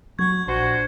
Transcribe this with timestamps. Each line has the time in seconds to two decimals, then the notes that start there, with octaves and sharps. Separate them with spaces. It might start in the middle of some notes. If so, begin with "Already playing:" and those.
0.19 F#3 C#6 G#6
0.47 A#1 D4 F#4 C5